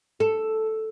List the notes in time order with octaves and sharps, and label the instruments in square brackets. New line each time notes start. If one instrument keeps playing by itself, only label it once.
[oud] A4